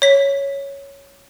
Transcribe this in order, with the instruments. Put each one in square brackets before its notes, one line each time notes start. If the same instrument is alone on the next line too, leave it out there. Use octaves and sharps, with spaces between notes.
[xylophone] C#5 B6